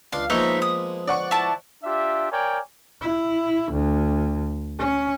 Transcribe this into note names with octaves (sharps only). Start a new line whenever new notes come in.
C#2 D4 F5 C6
F3 G#3 A#3 B3 D#4 C#5 E5
D#6
D5 F#5 C#6
E4 A5
D4 F4 G4 E5
A#4 C#5 D5 G5 G#5
E4
D2
C#4